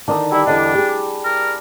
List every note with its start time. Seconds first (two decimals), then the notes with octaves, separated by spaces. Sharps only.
0.08 D3 D#3 D4 D#4 D#6
0.32 G3 E4
0.47 E2 D3 D4 D#5
0.74 G4 G#4
1.25 A#4